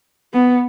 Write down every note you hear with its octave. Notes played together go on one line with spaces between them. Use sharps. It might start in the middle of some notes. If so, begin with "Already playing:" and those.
B3